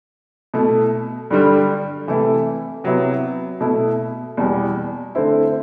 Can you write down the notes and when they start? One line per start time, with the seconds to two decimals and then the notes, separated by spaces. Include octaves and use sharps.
0.54 B2 A3 E4
1.30 G2 D3 G3
2.07 C3 E3 A3 E4
2.84 C3 F#3 B3 E4
3.61 B2 A3 E4
4.37 E2 B2 G3
5.15 D3 A3 C4 E4